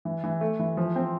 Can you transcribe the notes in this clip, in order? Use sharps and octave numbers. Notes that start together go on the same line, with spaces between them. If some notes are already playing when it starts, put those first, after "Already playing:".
E3
E3
A3
E3
F3
C4